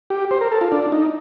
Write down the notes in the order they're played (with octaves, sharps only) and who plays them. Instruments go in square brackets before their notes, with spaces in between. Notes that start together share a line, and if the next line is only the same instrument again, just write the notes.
[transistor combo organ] G4
C5
A#4
A4
F4
D4
D#4